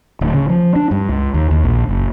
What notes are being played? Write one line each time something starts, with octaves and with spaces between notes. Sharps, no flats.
D1
C#3
F3
D4
G2
C#2
D#2
D#2
A#1
F#1